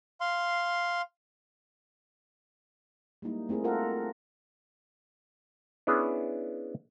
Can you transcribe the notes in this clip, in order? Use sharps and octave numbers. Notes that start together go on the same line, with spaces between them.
F5 C6
G3 G#3 A#3 D#4 E4
A3 C4 E4 G#4 A#4
F4 A4 A#4 F#5
B3 C#4 D4 E4 G#4